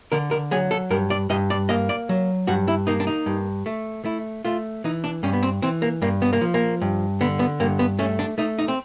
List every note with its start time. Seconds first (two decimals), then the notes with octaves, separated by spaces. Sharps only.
0.12 D3 A#4
0.31 A#4
0.51 F#3 G#4
0.71 A4
0.90 G2 A#4
1.10 D5
1.30 G2 D#5
1.50 D5
1.69 A#3 D#5
1.89 D5
2.09 F#3
2.47 G2 F#4
2.68 E4
2.87 A#3 D#4
3.00 D4
3.07 D#4
3.26 G2
3.66 A3
4.05 A3 E4
4.45 A3 F4
4.84 E3 D#4
5.04 D4
5.23 G2 C#4
5.33 B3
5.43 C4
5.62 E3 C4
5.82 A#3
6.02 G2 A#3
6.22 B3
6.33 A#3
6.41 F3
6.54 A#3
6.81 G2
7.21 D3 B3
7.39 B3
7.60 G2 A#3
7.79 B3
7.99 A3 C#4
8.19 D4
8.38 A3 D#4
8.59 D#4
8.68 C4